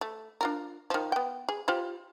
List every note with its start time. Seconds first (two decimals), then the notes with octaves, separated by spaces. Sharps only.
0.01 A3
0.41 D4 F4 A#4
0.90 D#3 F3
1.12 B3 G5
1.49 G#4
1.68 F4 G4 C5